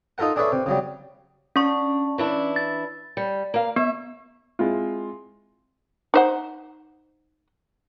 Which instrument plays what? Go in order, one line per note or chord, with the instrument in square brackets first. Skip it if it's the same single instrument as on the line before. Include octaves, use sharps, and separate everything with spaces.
[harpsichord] D#4 F4 A4 A#4 F#5
D4 G#4 A4 B4 C#5 E5
C3
C#3 F#3 G3
[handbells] C#4 C#6 [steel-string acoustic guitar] D4
[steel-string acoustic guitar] E3 D4 E4
[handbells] A6
[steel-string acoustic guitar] G3
A#3 F5
[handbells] B3 [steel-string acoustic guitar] E5
[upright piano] G#3 C4 E4 F4
[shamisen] D#4 C5 F#5